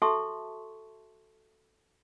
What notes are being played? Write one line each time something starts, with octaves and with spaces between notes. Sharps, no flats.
F#4 A4 E5 A5 C6 C#6